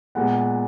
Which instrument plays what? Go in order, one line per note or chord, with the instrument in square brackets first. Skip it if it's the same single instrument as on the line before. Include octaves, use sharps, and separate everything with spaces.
[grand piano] A#2 G#3 B3 F#5